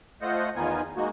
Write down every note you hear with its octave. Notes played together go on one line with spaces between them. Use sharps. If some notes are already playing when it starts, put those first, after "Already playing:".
A3 F4 C5 D#5 F#5
E2 D#3 B3 D#4 F4 G#5
G#3 A#3 D#4 F#4